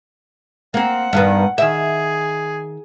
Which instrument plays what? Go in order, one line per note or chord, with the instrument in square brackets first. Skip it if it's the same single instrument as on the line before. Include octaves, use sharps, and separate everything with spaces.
[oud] A#3 C4 [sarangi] F#5
[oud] G2 D#3 B3
[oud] D#3 E5 [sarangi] G#4